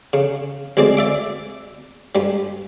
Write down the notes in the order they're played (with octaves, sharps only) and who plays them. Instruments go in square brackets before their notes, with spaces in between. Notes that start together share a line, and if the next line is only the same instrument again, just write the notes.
[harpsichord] C#3
D2 G#3 C4 G#4 D5
D5 E5 D6
G2 G3